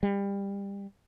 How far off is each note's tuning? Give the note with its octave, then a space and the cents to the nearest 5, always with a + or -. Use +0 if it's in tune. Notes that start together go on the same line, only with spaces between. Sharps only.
G3 +25